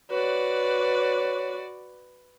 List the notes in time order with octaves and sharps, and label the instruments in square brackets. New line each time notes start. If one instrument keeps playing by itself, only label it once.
[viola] F#4 D5 [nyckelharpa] B4 [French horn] C#5